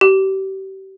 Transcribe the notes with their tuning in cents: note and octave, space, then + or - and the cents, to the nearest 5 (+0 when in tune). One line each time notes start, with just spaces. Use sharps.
G4 -35